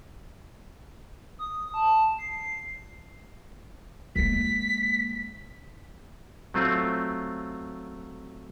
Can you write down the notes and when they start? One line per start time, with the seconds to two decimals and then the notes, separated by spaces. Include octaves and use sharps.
1.39 D#6
1.74 A5
2.19 C7
4.16 G#3 A#3 B6
6.54 F#3 A3 C4 F4